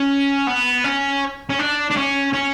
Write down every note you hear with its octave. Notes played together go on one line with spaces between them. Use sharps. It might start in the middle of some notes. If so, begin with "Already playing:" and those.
Already playing: C#4
B3
C#4
C#4
D4
D4
C#4
C#4